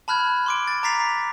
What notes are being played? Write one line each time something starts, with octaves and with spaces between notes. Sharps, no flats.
A5 B5 F6 F#6 G#6
C6 D6 D7
A6
A#5 D6 A6 B6 C7 F7